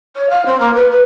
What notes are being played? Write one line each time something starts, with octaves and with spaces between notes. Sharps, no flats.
C#5
F5
C4
A#3
B4
B4